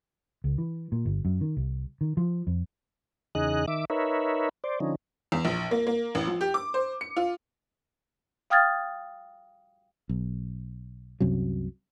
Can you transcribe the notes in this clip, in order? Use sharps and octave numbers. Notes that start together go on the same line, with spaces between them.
C#2
E3
A#2
G1
F#2
D#3
C2
D#3
F3
F2
E2 C#3 D#4 G#4 D#5 F#6
D#3 E5 D6
D#4 A#4 B4 C#5 E5
C5 D5
D3 F3 C#4 D#4
E2
A#1
A#3
A#3
A1
F3
G4
D6
C5
C#7
F4
F5 G5 D#6 F6 G#6 A6
B1
C2 F#2 C3 F#3